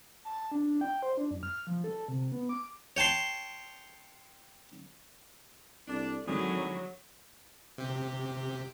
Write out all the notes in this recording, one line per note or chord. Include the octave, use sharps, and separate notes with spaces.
A5
D4
G5
C5
D4
F#2
F6
F3
A4
C3
B3
D6
C#5 G5 A5 C6
C2 D4 A4 D5
G#1 A2 D3 F#3 G#4
C3 G4